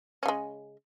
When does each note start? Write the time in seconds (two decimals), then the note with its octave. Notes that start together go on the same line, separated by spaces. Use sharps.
0.23 C#4
0.26 C#3
0.28 G#3